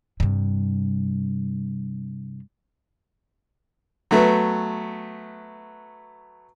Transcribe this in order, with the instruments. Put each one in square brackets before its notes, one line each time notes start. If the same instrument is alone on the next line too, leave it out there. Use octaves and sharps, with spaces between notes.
[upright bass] G2 C3
[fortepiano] F#3 A3 B3